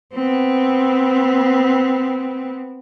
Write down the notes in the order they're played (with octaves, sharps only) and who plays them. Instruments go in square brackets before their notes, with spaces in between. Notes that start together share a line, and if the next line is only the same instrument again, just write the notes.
[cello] B3 C4